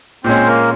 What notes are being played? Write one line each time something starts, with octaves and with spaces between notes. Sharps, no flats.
A#2 G#3 C4 C#4 C5
A#3 A#4